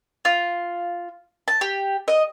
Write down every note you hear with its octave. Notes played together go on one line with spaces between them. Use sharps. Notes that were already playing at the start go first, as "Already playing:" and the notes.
F4
A5
G4
D#5